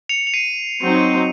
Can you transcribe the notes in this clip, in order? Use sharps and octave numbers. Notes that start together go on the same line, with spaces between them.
C#7 F7
F7
C7 D#7
F#3 C4 D#4